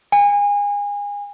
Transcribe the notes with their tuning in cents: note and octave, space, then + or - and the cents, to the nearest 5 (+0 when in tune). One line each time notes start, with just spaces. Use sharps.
G#5 -30